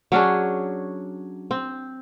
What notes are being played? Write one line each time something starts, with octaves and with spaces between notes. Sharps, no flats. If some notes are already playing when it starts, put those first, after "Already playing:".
F#3 C#4 D4 G#4
C4